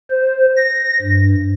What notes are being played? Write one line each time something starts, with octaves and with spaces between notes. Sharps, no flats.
C5
A#6
G2